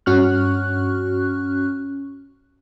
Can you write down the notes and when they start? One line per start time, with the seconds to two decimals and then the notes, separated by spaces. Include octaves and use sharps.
0.06 G2 C#4 F#4 C#6 F6 F#6